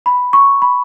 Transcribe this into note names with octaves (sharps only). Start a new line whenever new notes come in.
B5
C#6
B5